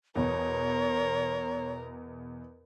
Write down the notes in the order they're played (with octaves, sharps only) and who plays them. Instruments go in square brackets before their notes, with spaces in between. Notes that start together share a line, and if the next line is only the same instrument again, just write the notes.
[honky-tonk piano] E2 B2 [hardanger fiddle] A#4 [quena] C#5